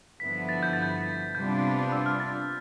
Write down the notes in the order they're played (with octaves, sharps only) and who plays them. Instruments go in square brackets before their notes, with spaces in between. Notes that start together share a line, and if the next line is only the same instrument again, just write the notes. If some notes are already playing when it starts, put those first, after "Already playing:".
[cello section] G2 D3 F3 B3 E4 [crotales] B6
[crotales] A6
G6
A6
G6
[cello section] C3 G3 B3 D4 F4 [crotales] G6
[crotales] E6
F6
A6